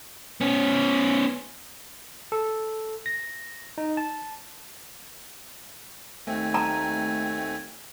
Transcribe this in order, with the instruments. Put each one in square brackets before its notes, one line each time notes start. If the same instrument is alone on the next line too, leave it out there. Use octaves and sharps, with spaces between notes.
[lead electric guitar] B3 C#4
[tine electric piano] A4
A#6
D#4
A5
[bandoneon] D#2 D#3 G#5 [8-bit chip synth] A3 C4
[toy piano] A5 A#5